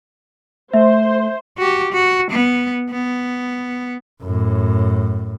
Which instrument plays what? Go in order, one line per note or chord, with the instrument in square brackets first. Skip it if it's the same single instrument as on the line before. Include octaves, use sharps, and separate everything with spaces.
[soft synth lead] A3 [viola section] C5 [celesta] E5
[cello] F#4 G4
F#4
B3
B3
[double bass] F#2 A2